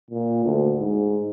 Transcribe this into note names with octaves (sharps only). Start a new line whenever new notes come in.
A#2
D2
G#2